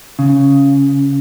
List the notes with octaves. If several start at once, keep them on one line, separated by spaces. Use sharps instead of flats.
C#3